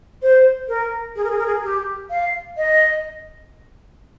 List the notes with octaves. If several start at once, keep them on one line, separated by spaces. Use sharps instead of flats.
C5
A#4
G#4
A#4
G#4
A#4
G#4
G4
F5
D#5